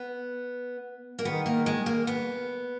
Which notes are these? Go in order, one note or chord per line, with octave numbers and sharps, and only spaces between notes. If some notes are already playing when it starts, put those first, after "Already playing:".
Already playing: B3
A#3
D#3 B3
A#3
G#3
A#3
B3